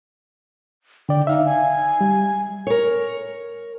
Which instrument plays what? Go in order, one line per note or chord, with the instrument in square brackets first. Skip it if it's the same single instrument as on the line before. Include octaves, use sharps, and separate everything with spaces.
[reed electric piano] D3 D5 [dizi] G5
[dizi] D#4 [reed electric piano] E5 F5
[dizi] G#5
[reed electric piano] G3
[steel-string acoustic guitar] A#4 C#5